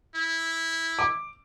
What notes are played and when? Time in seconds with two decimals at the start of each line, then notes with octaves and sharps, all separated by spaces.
0.15 E4
0.99 D6